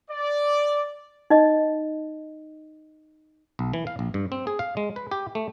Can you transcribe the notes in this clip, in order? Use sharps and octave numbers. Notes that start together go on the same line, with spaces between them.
D5
D#4 D#5
B1
E3
F5
A#1
G2
C4
G#4
F5
G#3
B4
G4
A3